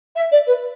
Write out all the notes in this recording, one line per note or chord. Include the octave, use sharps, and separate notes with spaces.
E5
D5
B4